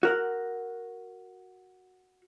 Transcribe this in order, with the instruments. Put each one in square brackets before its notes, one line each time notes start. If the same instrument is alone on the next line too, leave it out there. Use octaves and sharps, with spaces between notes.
[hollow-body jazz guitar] F#4 A#4 F#5